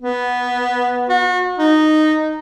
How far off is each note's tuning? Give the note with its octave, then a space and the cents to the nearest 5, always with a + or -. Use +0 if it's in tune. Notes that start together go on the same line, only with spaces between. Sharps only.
B3 -5
F#4 -35
D#4 -10